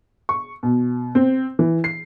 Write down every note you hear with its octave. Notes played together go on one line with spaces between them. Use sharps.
C#6
B2
C4
E3
C7